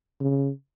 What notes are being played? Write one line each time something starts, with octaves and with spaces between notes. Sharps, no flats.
C#3